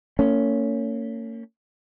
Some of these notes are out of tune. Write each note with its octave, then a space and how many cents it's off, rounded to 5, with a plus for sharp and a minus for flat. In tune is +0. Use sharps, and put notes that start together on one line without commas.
A#3 -40 C#4 +10